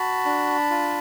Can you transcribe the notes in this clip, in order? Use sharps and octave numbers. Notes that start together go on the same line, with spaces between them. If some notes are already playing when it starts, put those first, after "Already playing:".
Already playing: F#4 A5 B5
D4
F4